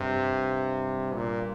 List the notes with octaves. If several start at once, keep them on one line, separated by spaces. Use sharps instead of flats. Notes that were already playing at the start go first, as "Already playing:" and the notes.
Already playing: G2 C3
A#2